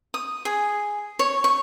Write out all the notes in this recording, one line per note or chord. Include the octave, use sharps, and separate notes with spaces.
D#6
G#4
C#5
C#6